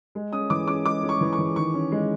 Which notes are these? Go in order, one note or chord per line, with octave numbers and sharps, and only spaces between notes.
G#3
C#4 D#6
E3 D6
C#4 D6
G#3 D6
C#4
C#6
E3
C#6
E3
D#3 C#6
C#4
G#3